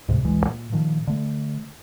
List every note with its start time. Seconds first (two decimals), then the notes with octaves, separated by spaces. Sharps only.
0.08 D2 G#2 C3
0.24 A1 D2 E3 G#3
0.46 A#2
0.72 A#2 D#3 F3
1.07 D3 A3